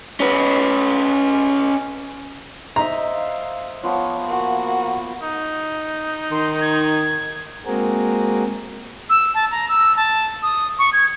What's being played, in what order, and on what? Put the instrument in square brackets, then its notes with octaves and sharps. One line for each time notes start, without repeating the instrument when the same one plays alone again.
[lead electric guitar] C#4 B4
[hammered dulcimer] C5 D#5 E5 [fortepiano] A#5
[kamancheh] F5
[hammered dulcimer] F3 B3 [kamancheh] C#5
[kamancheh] A#3 F#4
[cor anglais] D#4
[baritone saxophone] D#3 [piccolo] C6
[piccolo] G#6
[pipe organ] G#3 A#3 C4 F#4 G#4 A#4
[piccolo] E6
A5
A#5
E6
A5
D#6
C#6
G#6